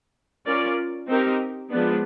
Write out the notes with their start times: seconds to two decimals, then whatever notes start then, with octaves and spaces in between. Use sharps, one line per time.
0.46 C#4 F4 A#4 D5
1.08 C4 D#4 G4 A#4
1.70 F3 G#3 B3 D4